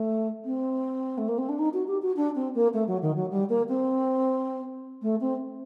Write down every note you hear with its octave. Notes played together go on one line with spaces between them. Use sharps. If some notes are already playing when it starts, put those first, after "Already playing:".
Already playing: A3
C4
A3
A#3
C4
D4
D#4
F#4
G4
F#4
D4
C4
A#3
A3
F#3
D#3
F#3
G3
A#3
C4
A3
C4